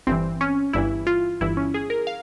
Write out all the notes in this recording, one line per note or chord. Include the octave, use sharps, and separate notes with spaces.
G1 G2 E3 C4
C#4
G1 G2 E3 E4
F4
G1 G2 E3 E4
C#4
G#4
A#4
F5